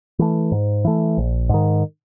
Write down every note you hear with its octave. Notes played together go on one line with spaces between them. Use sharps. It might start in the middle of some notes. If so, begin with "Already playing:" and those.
E3 A3
G#2
E3 A3
A#1
G#2 D#3